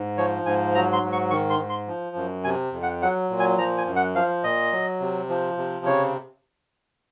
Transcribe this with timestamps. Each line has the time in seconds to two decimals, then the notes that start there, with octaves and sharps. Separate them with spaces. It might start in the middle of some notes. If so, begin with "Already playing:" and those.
Already playing: G#2
0.18 F3 C#5
0.46 G#2 G#5
0.75 F#3 A#5
0.93 C6
1.03 G#2
1.12 C#6
1.31 D#3 C#6
1.50 C6
1.59 G#2
1.69 C6
1.87 F3
2.16 F#2
2.44 C3 G#5
2.73 F2
2.82 F#5
3.02 F#3 F#5
3.30 A#2
3.40 G#5
3.58 F3 A#5
3.78 G#5
3.87 F#2
3.96 F#5
4.15 F3 F5
4.44 A#2 D#5
4.72 F#3
5.00 C3
5.29 F3
5.57 C3
5.85 C#3 C#5